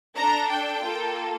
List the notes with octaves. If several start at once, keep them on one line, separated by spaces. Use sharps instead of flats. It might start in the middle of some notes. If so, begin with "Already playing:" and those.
D4 A4 A#5
G5
A#3 F4 A4